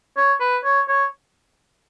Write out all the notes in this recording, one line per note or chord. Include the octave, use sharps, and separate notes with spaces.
C#5
B4
C#5
C#5